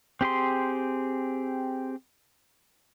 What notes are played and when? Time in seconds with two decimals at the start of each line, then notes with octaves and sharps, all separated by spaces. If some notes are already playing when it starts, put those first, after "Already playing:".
0.21 C4 G4 G#4 C6